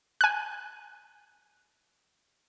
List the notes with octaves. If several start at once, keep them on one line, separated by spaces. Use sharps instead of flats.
G#5 F#6